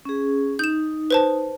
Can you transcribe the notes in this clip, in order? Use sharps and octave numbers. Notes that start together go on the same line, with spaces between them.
C#4 G#4
D#4 G6 E7
B4 C5 A5